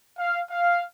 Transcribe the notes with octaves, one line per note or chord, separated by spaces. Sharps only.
F5
F5